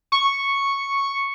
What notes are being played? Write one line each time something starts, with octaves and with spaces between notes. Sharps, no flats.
C#6